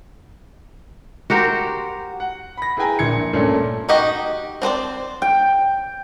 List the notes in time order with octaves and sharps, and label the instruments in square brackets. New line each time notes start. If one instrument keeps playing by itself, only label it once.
[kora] F#4 G4 A#4 C5
[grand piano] F#5
B5 A#6
E4 G#4 B4 G5 G#5 A#5
A#1 A#2 G#6 C#7
G2 A#2 A3 C#4 D4
[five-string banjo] D#4 F#4 G4 D#5
C4 D4 C5 D5
[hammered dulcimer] G5